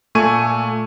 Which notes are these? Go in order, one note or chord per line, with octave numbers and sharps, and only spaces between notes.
A#2 A3 G#5 C#6 G#6 D#7